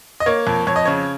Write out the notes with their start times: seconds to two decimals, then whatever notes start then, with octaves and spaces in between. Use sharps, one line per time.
0.20 D#5
0.26 A#3 C#5
0.47 F2
0.67 F2 C#5
0.76 D#5
0.85 C#3 C#5